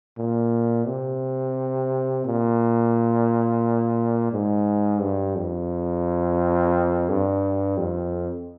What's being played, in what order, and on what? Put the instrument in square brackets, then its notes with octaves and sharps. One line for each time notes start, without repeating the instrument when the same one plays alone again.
[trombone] A#2
C3
A#2
G#2
G2
F2
G2
F2